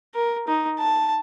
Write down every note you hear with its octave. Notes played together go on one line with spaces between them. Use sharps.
A#4
D#4
A5